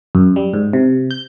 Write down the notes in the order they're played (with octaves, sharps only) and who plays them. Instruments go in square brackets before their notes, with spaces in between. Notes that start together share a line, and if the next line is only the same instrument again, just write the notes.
[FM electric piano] F#2
G3
G#2
C3
G6